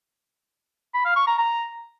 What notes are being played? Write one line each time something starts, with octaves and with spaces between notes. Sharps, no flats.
B5
F5
C#6
A#5
A#5